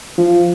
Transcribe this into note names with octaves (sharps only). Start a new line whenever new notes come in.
F3